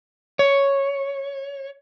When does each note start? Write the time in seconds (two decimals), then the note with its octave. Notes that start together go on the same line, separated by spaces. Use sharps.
0.39 C#5